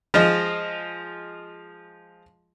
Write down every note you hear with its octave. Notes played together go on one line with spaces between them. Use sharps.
F3 G#3 F4 D#5